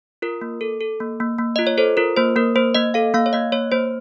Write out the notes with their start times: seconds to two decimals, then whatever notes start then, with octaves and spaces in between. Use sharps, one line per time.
0.22 F4 A#4
0.41 A#3
0.61 A4
0.81 A4
1.00 A#3
1.20 A#3
1.38 A#3
1.56 F4 D#5
1.67 C#5
1.78 A4 C5
1.97 F4 A#4
2.17 A#3 C5
2.36 A#3 A#4
2.56 A#3 C5
2.75 A#3 D#5
2.94 A4 F5
3.14 A#3 F5
3.26 C#5
3.33 A#3 D#5
3.52 A#3 C#5
3.72 A#3 C5